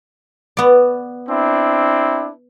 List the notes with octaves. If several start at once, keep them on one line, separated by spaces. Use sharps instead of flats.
B3 D5
C4 D4 E4